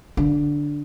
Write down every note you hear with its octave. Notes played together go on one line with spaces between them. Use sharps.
D3